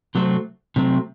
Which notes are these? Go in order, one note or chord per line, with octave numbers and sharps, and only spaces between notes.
C3 F#3 A3 C4
C3 F#3 A3 C4